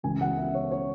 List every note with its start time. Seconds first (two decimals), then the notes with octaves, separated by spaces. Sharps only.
0.03 C#2 C#3 E3 G#5
0.21 F#5
0.38 E5
0.55 C#5
0.72 C#5